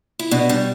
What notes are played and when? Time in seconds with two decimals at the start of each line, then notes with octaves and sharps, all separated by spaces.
0.19 E4
0.31 B2 D4
0.49 G3 D4